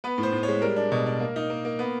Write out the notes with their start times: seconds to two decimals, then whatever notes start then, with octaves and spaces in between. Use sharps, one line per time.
0.04 B3 B4
0.18 A2
0.23 C5
0.33 A2
0.43 C#5
0.48 G#3
0.62 G3 A#4
0.76 D4
0.92 B2
1.06 D4
1.20 A#3
1.36 D#4
1.50 A#3
1.65 A#3
1.79 B3